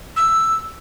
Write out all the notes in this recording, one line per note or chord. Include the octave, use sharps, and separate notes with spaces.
E6